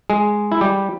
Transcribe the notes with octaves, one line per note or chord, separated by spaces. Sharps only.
G#3 G#4
E4
G3 G4